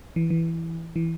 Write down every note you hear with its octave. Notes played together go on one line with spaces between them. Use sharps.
E3
E3
E3